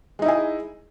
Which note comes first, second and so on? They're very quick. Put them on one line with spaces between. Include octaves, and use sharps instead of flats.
G#3 D#4 E4 G#4